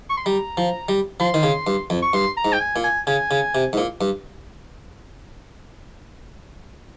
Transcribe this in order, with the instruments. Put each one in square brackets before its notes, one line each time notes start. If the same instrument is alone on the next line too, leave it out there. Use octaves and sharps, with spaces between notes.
[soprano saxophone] C#6
C6
[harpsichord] G3 [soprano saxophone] A#5
[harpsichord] F3
G3
[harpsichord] F3 [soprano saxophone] C6
[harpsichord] D#3
C#3
G2
F2
[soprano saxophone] C#6
[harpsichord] G2 [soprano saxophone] C6
[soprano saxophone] A#5
[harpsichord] G#2
[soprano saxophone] G5
G#5
[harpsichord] A#2
[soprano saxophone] G#5
[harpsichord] C#3 [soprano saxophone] G#5
[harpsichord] C#3
C3
G#2
A#2
G2